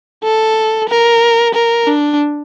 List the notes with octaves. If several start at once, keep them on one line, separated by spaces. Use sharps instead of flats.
A4
A#4
A#4
D4